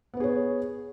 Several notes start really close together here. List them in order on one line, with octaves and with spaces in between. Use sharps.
B3 B4 G#4 C#5